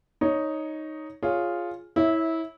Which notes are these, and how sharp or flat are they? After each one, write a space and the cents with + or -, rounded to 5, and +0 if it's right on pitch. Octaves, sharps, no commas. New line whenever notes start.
D#4 +0 C#5 +0
F4 +0 G#4 +0 C#5 +0
E4 -20 C#5 -10 E5 -10